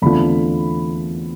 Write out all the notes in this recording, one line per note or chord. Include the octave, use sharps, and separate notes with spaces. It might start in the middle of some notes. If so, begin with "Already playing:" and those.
E2 D3 A3 C4 F4 B5